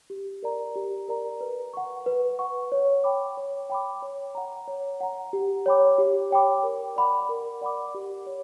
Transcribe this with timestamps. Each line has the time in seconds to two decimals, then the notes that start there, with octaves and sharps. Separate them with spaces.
0.10 G4
0.43 A#4 D5 A#5
0.76 G4
1.08 A#4 D5 A#5
1.41 B4
1.74 F#5 C#6
2.06 B4
2.39 F#5 C#6
2.72 C#5
3.04 G5 B5 D6
3.37 C#5
3.70 G5 B5 D6
4.02 C#5
4.35 F#5 A#5
4.68 C#5
5.01 F#5 A#5
5.33 G4
5.66 C#5 G5 B5 D6
5.98 G4
6.31 C#5 G5 B5 D6
6.63 A#4
6.96 D5 F#5 B5 D6
7.29 A#4
7.61 D5 F#5 B5 D6
7.95 G4
8.27 C#5